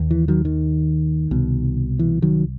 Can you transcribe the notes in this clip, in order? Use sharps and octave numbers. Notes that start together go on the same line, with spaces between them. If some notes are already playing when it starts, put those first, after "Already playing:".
Already playing: D#2
E3
D#3 F#3
D#3
C2 B2
E3
D#3 F#3